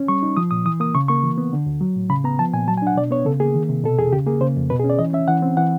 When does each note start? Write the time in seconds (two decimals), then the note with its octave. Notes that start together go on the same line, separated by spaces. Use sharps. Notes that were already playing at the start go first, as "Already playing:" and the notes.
Already playing: C#4
0.08 G3 C#6
0.23 D#4
0.37 F3 D#6
0.51 A#2 D#6
0.65 E3 D#6
0.80 A#3 D#6
0.95 C#3 C#6
1.08 A#3 C#6
1.23 E3
1.38 B3
1.53 D3
1.66 D2
1.81 F#3
1.96 A2
2.10 C#3 B5
2.24 B3 A#5
2.39 F3 A5
2.53 A#2 G#5
2.67 F#3 A5
2.77 G#5
2.82 D4 F#5
2.97 B2 D5
3.11 B3 C#5
3.25 C#3 A4
3.40 A#3 G#4
3.54 D#3
3.69 C3
3.83 B2 A4
3.99 E2 G#4
4.13 C#3 G4
4.27 A#3 G#4
4.41 C#3 C5
4.56 F2
4.70 B2 B4
4.80 G#4
4.84 C#4
4.90 D5
4.99 E3 D#5
5.13 C#4 E5
5.28 E3 F#5
5.42 C4
5.57 E3 F#5